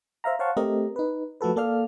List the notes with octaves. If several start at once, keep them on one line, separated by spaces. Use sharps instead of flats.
C5 E5 F5 A#5
C5 C#5 F5 F#5 A5 C#6
A3 C4 G4 A#4 D#5
D#4 B4
F3 A3 F#4 A4 B4
A#3 A4 D5 F5 F6